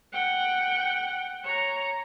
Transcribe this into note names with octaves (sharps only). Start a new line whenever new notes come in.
F#5 G5
C#5 A#5